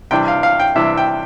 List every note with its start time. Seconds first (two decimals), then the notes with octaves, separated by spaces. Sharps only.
0.11 C3 E3 G3 D4 G5
0.28 F5
0.43 F5
0.60 G5
0.76 C3 E3 G3 D4 E5
0.97 G5